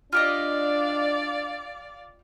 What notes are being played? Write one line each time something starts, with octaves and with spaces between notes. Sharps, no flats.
D4 F4 G4 D5 D#5 F5